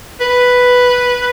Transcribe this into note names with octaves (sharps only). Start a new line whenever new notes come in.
B4